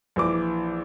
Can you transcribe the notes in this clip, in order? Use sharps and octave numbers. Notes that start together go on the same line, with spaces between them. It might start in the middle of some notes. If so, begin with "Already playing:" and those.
A#1 E3 D6